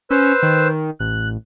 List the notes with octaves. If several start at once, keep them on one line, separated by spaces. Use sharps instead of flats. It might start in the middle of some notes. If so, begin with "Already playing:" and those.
C#4 B4 C5 E6
D#3
A1 F#6